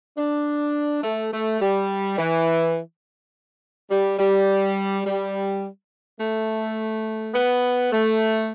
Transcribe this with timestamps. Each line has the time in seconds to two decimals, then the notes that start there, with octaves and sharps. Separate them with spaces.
0.18 D4
1.03 A3
1.32 A3
1.61 G3
2.18 E3
3.91 G3
4.19 G3
5.05 G3
6.19 A3
7.34 B3
7.92 A3